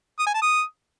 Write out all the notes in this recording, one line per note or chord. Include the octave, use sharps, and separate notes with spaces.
D#6
G#5
A5
D#6